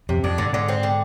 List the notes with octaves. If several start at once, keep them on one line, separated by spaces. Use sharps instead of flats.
F2 C3
F2 D4
G2 D3
G#2 D3
C4
D3